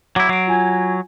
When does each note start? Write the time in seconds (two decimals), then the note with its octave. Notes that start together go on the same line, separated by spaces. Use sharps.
0.16 F#3 E4 D6
0.29 F#3 C7 D7
0.47 F4 G#5 G#6